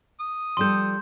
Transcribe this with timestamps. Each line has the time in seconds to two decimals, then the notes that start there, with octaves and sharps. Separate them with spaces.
0.20 D#6
0.57 F3 G3 A4 C6 G6